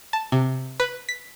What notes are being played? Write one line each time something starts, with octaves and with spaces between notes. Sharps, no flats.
A5
C3
B4
B6